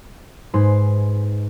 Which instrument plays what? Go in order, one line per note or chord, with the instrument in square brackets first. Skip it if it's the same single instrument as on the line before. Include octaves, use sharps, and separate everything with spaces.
[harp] G#2 G#3 B4 C6 C7